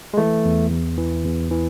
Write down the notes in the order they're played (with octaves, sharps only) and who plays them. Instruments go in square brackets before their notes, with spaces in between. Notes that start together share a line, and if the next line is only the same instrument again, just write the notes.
[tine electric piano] G#3
E3 A3
E2
E2
E3
E2
E3